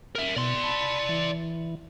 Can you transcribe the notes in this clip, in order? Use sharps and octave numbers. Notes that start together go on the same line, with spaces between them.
A#4 E5
B2 D5 C6
A5 B5
E3